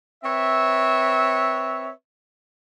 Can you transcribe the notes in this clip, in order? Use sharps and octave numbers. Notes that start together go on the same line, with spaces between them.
C4 B4 C#5 E5